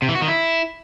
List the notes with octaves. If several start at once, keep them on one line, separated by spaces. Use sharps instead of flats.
C3
E3
F#4
D#3
E4